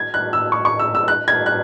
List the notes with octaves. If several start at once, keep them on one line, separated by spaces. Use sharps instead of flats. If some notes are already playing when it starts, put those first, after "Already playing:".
Already playing: G#6
F#6
E6
C#6
C#6
E6
E6
F#6
G#6
F#6